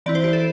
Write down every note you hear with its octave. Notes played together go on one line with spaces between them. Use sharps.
E3 C4 E4 D5
C5
G4
A4